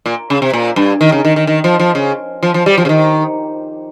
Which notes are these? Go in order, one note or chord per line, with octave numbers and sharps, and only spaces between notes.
A#2
C#3
C3
A#2
G2
D#3
C#3
D#3
D#3
D#3
F3
F3
C#3
F3
F3
G3
F3
C#3
D#3